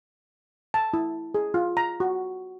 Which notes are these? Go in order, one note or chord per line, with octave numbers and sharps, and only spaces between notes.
A5
E4
G#4
F4
A#5
F#4